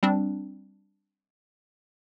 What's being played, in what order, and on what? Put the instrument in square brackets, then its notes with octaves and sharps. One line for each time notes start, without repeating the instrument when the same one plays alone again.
[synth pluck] G3 C4 D4